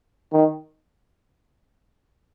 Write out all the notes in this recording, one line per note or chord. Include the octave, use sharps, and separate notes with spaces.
D#3